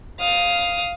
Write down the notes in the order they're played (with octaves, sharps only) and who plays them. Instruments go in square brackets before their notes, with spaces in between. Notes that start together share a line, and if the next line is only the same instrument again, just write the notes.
[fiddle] F5 D#6